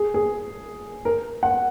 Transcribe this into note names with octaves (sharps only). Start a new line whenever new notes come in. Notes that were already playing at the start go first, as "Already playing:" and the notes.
Already playing: G#4
G#4
A#4
F#5